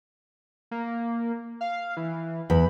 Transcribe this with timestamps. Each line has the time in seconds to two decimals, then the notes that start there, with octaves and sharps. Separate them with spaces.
0.71 A#3
1.61 F5
1.97 E3
2.50 E2 B5